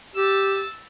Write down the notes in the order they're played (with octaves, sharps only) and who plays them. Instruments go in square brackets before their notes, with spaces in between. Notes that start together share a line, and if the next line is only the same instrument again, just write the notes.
[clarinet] G4 [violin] E6 A6